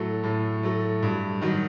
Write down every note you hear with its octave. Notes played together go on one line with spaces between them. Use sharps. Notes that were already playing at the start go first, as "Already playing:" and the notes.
Already playing: A2 F#3 A3
A2
F#3 A3
G2
D#3 F#3